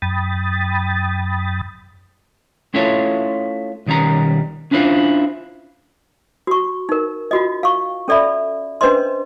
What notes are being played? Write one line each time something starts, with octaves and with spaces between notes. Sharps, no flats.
F#2 G5 B5 D#6 A6
A3 C#4 E4 F4 A4 C#5
B1 D#3 G3 C#4 A#5
C#4 D4 E4 F4 C5
F#4 C#6
D#4 A#4
F4 F#4 D#5
F5 C#6
C#4 A4 D5 E5 B5
C#4 D4 B4 C5 D#5 C6